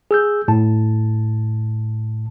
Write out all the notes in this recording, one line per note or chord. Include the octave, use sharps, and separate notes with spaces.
G#4 E6 G6
A2 A5